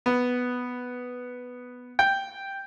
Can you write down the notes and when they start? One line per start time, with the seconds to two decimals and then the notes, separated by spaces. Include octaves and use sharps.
0.06 B3
1.99 G5